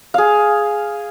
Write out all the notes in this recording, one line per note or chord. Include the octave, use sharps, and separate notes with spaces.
G#4 F5